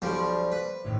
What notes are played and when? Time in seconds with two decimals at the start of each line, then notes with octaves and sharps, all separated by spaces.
0.02 B1 F3 G3 C5 D5
0.52 B4
0.84 A1 A2 D#3